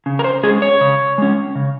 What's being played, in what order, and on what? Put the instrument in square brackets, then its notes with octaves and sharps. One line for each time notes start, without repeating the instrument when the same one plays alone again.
[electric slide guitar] C#3
A#4
C5
G#3 C#4 G#4
C#5
C#3
G#3 C#4
C#3